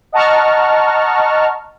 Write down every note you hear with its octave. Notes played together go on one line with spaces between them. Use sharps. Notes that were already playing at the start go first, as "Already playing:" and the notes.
D#5 F#5 A5 A#5 C#6 F6